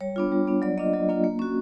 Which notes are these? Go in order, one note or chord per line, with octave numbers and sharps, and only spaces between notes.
G3 C#5
B3 D4 F4
G3
B3 D4 F4
F#3 D5
A#3 D4 F4 D#5
F#3
A#3 D4 F4
A#3
C#4 F#4